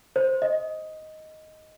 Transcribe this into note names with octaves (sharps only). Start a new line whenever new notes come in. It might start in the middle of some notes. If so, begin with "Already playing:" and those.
C5
D#5